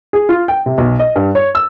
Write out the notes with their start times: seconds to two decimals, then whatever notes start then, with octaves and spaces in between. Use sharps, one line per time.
0.13 G#4
0.29 F4
0.48 G5
0.66 C3
0.78 B1
0.99 D#5
1.16 G2
1.35 C#5
1.55 E6